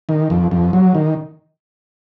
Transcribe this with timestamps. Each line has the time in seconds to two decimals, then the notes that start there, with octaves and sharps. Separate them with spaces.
0.09 D#3
0.30 F2
0.51 F2
0.73 F#3
0.95 D#3